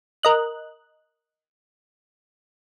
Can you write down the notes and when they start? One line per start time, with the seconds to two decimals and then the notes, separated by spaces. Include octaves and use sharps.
0.23 A#4 D#5 F#6